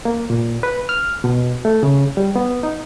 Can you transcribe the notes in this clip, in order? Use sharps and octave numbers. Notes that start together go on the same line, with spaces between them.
A#3
A#2
B4
F6
B2
A3
C#3
G3
B3
D#4